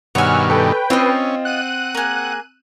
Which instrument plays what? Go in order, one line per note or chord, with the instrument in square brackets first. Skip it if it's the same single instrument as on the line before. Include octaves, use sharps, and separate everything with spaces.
[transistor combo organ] G2 B2 D#3 [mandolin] C#5 G#5 [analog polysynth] F#5 E6 F6
[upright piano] A4 [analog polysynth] B4 G5
[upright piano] C4 [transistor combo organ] C#4 [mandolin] F4 D#5
[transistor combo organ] F#5 [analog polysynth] F#6 D#7
[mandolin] A#3 G#4